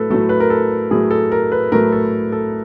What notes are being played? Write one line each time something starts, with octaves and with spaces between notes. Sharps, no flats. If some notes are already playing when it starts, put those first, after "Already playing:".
Already playing: A2 F#3 A3 A4 B4
A2 F#3 A3 A4
B4
A#4
A4
A2 F#3 A3 G#4
A4
A#4
B4
A2 F#3 A3 A#4
A4
A4